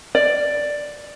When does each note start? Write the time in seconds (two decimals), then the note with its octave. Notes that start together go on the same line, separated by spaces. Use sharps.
0.15 D5